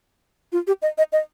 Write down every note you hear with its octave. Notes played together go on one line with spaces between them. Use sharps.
F4
G4
D#5
D#5
D#5